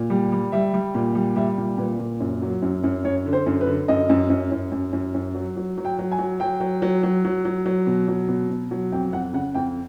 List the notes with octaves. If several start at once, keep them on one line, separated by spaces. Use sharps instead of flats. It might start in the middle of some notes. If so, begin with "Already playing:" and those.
Already playing: A#2
G3
G3
G3 E5
G3
A#2
G3
G3 E5
A#2
A#2 B4
A#2
F#2
F#3
F#2
F#2
F#2 C#5
D3
C5
F#2
B4
D3
F#2 D#5
F#2
F#2
F#2
F#2
F#2
F#2
F#3
F#3
F#3
G5
F#3
G#5
F#3
F#3 G5
F#3
F#3
F#3
F#3
F#3
F#3
B2
F#3
B2
B2
F#3
F2 G5
F2 F#5
C#3 F#5
F2 G5